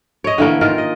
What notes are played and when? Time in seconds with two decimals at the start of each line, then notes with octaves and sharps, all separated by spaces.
0.24 C#5 D#5
0.38 D3 E3 A3 A#3
0.61 D#3 F4 A#4
0.78 D#5